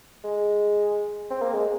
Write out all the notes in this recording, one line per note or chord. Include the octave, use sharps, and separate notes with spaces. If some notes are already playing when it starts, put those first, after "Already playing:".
G#3
C4
A#3
G#3